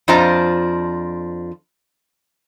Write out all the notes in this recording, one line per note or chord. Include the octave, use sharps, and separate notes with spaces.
F2 D4 F4 C5 D#5 A#5